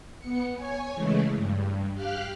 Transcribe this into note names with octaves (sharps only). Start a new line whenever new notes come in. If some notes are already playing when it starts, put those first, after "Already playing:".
B3 C#7
C#5 G#5
C#3 E3 G#3 A3
G2
G4 F5 F6 F#6